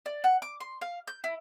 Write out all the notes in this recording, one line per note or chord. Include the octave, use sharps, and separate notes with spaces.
D5
F#5
D6
C6
F5
G6
E4